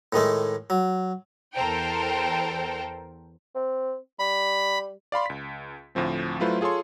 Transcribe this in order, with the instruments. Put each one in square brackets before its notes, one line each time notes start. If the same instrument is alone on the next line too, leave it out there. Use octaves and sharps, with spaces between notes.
[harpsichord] A2 D#3 G#3 A3
F#3
[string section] E2 A4 A#4 C5 G5
[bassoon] C4
[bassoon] G3 [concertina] B5
[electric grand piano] D5 F5 B5 C6
C#2 B6
D2 A2 F3 C4
F#3 A3 E4 F4 B4 C5
F4 G#4 A4 C#5 C6